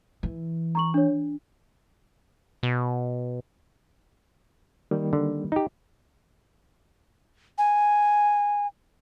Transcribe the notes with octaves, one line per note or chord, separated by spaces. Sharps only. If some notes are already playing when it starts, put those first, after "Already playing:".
E3
A#5 C#6 F#7
D4 C#5
D4
B2
D#3 G3 A#3
D3
D#4 G4
G#5